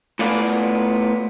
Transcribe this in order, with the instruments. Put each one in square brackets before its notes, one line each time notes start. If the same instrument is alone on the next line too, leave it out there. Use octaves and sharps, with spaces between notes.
[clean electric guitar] A2 B3 F4 D5